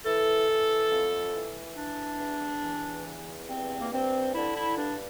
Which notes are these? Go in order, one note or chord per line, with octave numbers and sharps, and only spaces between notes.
E3 A4
E3
F2
E3
E3 D4
E2
E3
E2
G2 C4
A#3
G2 C4
D3 E4
E4
G2 D4